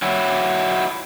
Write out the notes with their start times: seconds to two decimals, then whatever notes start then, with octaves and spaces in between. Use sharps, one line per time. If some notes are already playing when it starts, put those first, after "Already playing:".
0.02 F#3 E4